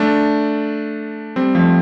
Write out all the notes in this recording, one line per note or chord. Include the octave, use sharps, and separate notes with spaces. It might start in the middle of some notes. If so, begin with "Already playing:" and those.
Already playing: A3 D4
G3 C4
F3 A3